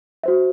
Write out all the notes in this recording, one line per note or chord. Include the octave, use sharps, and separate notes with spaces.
F#4 C5 E5